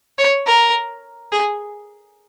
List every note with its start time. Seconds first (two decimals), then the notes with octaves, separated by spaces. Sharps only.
0.18 C#5
0.46 A#4
1.32 G#4